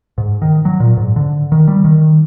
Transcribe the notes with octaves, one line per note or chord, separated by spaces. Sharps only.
G#2
D#3
F#3
A#2
G#2
D3
D#3
G3
D#3